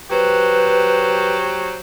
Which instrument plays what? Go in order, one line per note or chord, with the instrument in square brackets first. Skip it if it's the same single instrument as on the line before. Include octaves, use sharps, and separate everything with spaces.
[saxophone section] F#3 G4 C5 [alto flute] B4